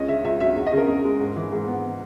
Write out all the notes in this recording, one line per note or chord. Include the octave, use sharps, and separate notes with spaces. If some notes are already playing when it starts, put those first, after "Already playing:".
Already playing: C#2 C#4 D#5
C#3 E5
C#2 E5
F#3 E5
E2
D#5
C#3 A#4
E2
G#3
G#2
E3
G#2
B3